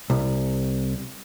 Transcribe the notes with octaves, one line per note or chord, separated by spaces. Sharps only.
C2